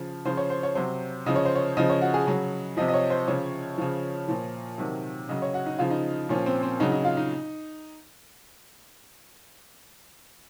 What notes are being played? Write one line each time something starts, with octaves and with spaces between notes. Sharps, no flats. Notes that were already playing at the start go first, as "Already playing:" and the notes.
Already playing: C#3 F3
C#3 F3 C5
C#5
C5
C#5
C3 F#3 C5
C#3 F3 D#5
C#5
C5
C#5
C#3 F3 D#5
C#5
F#4
G#4
C#3 F#3
C3 F3 D#5
D#5
C#5
C5
C#3 F3 C#5
C#3 F3
A#2 F3
C3 D#3 F#3
C#3 F#3 D#5
C#5
F#4
D#4
C#3 F3 F4
D#4
A#2 F3 C#4
C4
C4
C#3 F#3 D#4
D#4
F4
D#4